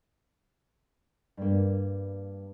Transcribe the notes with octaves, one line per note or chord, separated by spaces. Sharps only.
G2 A#3